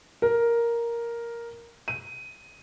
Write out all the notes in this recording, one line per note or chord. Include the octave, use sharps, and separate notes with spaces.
A#4
D#7